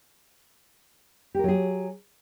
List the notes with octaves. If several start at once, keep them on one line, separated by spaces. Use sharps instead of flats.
F#3 G4 G#4 A#4